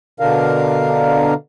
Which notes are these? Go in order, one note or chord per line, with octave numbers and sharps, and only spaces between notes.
B2 D3 D4 A#4 F5